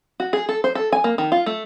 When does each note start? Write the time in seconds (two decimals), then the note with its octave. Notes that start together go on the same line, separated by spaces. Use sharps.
0.20 F#4
0.33 G#4
0.49 A4
0.64 C5
0.75 A4
0.92 G#5
1.04 A#3
1.18 D#3
1.32 F4
1.46 A3